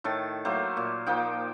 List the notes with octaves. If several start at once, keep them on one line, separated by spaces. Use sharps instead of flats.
A2 D#3 A4 A5
F#3 A3 A#3 C5
A#2
F3 A#3 D#4 G5